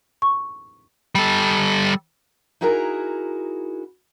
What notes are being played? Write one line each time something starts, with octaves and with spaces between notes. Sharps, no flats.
C#6
G3 A4
D#4 E4 F#4 G#4 A#4 A#5